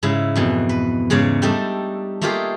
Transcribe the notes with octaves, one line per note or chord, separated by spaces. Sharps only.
G#2 C#3 E4
F2 B2 E3
B4
E2 G#2 C#3 C#5 D5
G3 A3 D4 D#4 A4
A3 A#3 D#4 F4 G4 G#4